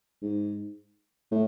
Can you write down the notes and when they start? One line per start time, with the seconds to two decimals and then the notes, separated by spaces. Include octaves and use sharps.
0.22 G#2
1.32 A2